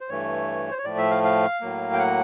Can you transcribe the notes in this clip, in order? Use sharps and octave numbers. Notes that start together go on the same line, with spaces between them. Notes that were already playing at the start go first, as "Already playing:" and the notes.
C5
G2 E3 A3 C#5
C5
C#5
A2 F3 A3 D5
E5
F5
F5
A2 F#3 A#3
G5
F#5